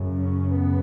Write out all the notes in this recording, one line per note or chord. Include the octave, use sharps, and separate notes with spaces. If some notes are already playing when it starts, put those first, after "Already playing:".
Already playing: F#2 C#3
C#4
B3